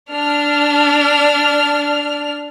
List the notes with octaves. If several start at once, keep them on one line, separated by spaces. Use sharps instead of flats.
D4 F6